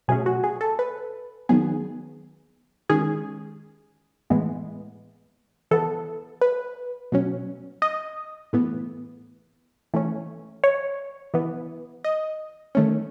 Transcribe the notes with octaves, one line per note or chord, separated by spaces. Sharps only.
B2 F#3 A3 C#4 G#4
F#4
G#4
A4
B4
D#3 F#3 B3 G#4
D#3 G#3 C#4 G#4
A2 E3 G#3 B3
E3 B3 A4
B4
B2 F#3 C#4
D#5
A2 E3 B3
E3 A3 C#4
C#5
E3 B3
D#5
D#3 A3 C#4